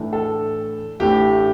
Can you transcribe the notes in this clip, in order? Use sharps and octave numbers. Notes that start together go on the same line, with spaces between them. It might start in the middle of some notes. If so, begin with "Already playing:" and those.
Already playing: A2 E3 A3 D4
A4
A1 A2 E3 A3 D4 G4